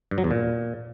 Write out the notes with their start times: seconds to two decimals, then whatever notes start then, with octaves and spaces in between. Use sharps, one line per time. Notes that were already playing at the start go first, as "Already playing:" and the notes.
0.11 G2
0.18 F#3
0.24 E2
0.31 A#2